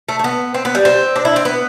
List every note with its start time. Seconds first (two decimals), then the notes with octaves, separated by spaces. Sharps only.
0.09 A3
0.19 A3
0.24 B3
0.54 C4
0.65 B3
0.75 G3
0.85 C4
1.16 D4
1.25 E4
1.36 C4
1.45 B3